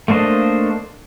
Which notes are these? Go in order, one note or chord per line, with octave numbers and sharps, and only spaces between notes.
A3 A#3 D4 C5 D#5